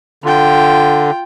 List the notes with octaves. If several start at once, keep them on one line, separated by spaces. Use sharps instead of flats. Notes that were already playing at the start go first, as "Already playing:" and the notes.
D3 F4 G5